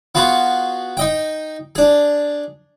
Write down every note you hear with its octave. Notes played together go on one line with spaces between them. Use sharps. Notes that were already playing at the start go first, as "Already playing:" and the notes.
B3 F4 F#4 G#4 B4
D#4 D#5 G5
D4 G#4